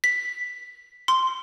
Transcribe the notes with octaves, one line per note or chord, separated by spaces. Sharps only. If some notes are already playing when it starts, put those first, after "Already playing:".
B6
C6